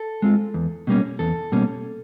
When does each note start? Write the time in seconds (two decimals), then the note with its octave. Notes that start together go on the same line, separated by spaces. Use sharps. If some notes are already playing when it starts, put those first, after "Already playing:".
Already playing: A4
0.22 G#3 C4 F4
0.54 E2
0.87 B2 G3 A#3 C#4
1.19 E2 A4
1.52 B2 G3 A#3 C#4